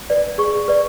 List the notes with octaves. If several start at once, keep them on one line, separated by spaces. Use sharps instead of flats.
B4 D5
G#4 C#6
B4 D5